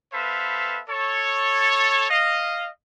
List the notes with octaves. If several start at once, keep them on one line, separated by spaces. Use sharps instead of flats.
B3 A4 B4 C5 E5 F5
A4 C#5
D#5 F5